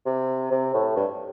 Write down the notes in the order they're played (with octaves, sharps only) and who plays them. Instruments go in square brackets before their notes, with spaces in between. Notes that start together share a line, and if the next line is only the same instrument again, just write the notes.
[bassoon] C3
C3
A2
G2